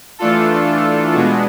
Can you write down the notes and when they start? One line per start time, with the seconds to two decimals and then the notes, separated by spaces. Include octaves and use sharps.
0.19 E3 A3 D4 F4 A4
1.13 B2 G#3 B3 D4 F#4